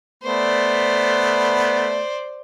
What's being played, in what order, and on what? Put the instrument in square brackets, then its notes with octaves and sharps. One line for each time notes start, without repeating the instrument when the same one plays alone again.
[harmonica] A3 B3 [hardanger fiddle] C5 D5